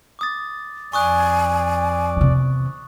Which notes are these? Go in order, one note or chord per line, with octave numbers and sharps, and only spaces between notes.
D6 D#6 A6
F2 D5 G#5 C#6 D#6 F#6
E2 C3